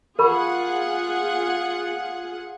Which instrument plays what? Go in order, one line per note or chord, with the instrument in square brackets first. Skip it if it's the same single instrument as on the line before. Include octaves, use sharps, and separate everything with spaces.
[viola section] F4 G#4 F#5 [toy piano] A#4 B5 C#6